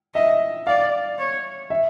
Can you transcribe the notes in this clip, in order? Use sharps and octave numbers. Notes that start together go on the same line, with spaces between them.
D#5 E5
D5 F5
C#5
E5